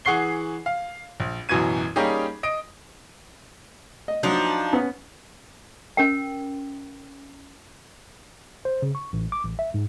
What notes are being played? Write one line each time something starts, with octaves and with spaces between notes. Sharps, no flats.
E3 G#4 F#5 C#6 C7 G7
F5
A#1
A1 F#2 B2 E3 G#6 D#7
G3 A#3 C#4 D#4 G4 G#4
D#5 D#6 D7
D#5
F3 F#3 D4 D#4
B3 C#4
C#4 A#4 G5
C5
C#3
C#6
A1
D6
A1
E5
G#2